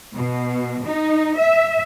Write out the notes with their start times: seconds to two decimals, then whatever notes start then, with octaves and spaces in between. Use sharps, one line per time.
0.17 B2
0.87 D#4
1.38 E5